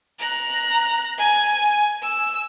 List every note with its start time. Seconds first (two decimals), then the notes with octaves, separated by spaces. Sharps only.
0.19 A#5 F#6
1.18 G#5
2.02 E6